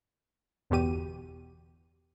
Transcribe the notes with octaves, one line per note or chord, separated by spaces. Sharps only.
G1 E2 B2 G4 D#7